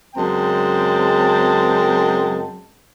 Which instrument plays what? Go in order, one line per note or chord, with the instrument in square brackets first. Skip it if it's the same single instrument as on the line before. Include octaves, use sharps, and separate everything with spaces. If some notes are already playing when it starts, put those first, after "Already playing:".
[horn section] F#2 C#3 G#3 C4 G5 A5